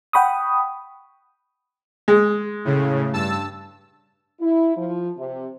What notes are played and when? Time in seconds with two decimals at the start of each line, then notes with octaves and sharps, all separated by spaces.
0.13 F#5 G5 B5 C#6 D#6
2.08 G#3
2.65 A2 C#3
3.13 G2 A5 E6
4.41 E4
4.77 F3
5.18 C3